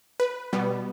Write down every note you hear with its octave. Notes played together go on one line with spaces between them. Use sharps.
B4
B2 G3 B3